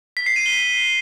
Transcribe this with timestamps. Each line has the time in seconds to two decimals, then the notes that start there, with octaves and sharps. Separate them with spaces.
0.17 B6
0.26 C7
0.36 D#7
0.46 G7